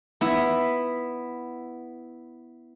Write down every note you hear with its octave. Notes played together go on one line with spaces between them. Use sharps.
B3 E4